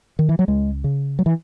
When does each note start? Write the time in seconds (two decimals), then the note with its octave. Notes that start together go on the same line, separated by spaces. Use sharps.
0.19 D#3
0.29 E3
0.39 F#3
0.48 C#2 G#3
0.84 C#3
1.19 F#3
1.26 E3